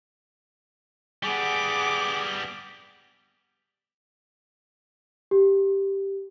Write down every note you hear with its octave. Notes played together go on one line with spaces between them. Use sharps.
G3 B3 G#4 F#5 D6
G4